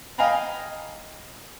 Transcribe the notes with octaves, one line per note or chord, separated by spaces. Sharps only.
D#5 F5 G5 G#5 A#5 B5